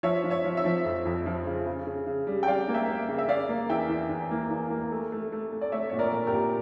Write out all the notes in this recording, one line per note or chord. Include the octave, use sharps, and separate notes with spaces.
F3 C#5 E5
F3
C#5 E5
F3
C#5 E5
F3
F2
F2
F3
C#3
C#3
C#3
C#3
G3
G5
G3 D5 F5
A#3
E5 G5
A#3
C#3
E5
C#3 D5 F5
A#3
E2 E5 G5
E2
E2
A#3
E2
A#3
A3
A3
A3
A3
D5
A3 C#5 E5
A#2 C#5
A#4 D5
A#2
G4 A#4
A#2